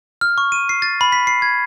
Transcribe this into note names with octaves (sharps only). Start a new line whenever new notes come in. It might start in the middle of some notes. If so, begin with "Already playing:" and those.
F6
C#6
D#7
C7
A6
B5
B6
C7
G#6